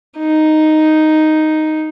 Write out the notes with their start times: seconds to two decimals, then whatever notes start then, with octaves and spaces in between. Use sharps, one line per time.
0.19 D#4